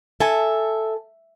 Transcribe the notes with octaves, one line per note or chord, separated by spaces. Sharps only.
A4 E5 G#5